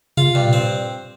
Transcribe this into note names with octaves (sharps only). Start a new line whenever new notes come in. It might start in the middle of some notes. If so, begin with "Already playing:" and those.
C#3 F4
G2 C3
A#2
C4